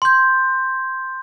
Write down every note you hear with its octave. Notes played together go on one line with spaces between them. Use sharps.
C6 G6